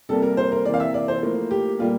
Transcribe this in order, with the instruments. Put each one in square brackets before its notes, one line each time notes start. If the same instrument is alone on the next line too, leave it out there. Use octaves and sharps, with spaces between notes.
[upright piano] C3 G3 A#3 A4
A#4
C5
A#4
C3 E3 A#3 D5
F5
E5
D5
C5
A2 F3 A#3
G4
A#2 G3 A#3 F4